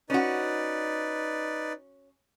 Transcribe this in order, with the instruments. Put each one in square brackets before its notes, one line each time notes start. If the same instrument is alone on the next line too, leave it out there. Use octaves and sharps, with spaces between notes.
[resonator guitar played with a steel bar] C#4 F#4 [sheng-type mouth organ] D#4 B4 D5